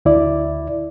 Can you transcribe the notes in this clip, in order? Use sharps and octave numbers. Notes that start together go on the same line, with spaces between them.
D2 E4 D5